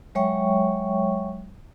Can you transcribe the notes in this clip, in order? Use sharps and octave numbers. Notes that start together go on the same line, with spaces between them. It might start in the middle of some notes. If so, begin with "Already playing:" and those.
F#3 G#3 C#5 E5 G5 C#6